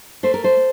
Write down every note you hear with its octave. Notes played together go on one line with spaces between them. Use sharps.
A3 C5
A#4
A4 C5